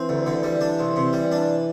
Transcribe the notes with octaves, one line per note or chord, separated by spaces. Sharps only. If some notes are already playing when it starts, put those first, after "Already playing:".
Already playing: E3 C4
D2
D3
G3
D4
C2
C3
G3
D4